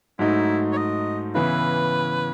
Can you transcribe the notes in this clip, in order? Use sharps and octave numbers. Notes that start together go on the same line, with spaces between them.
G#2 F#3 A3 D#4 E4
C#5
D#5
C#3 E3 B3 E4 B4